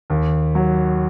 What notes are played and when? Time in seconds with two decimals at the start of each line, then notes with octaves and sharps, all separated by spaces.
0.10 D#2
0.55 F#3